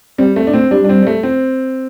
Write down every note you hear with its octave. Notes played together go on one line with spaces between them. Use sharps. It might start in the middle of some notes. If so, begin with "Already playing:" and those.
G3 C4
A3 C4
D4
A3 C4
G3 D4
D4
C4
G3
A3
C4